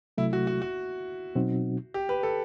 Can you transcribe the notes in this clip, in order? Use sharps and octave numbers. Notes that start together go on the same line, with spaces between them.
C3 F#3 A3 E4
F#4
F#4
F#4
B2 F#3 C4 D#4 F#4
G4
B4
A4